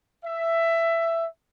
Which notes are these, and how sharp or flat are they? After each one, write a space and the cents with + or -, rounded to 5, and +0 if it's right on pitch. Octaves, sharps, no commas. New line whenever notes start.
E5 +15